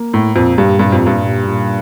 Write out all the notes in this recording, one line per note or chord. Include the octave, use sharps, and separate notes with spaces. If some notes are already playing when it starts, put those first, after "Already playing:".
Already playing: A#3
A2 A#3
F2 A#2
G2 G3
G2 A#2
F2
G2 A#2
A#2
A#2